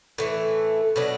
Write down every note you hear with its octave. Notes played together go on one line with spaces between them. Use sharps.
A2 E3 A3
B2 F#3 B3 D4